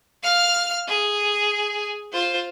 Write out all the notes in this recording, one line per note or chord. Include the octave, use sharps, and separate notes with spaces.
F5 F6
G#4
F4 C5